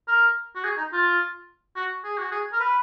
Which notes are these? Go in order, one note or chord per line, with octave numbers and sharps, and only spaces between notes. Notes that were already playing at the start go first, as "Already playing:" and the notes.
A#4
F#4
G#4
D#4
F4
F#4
G#4
F#4
G#4
A#4
B4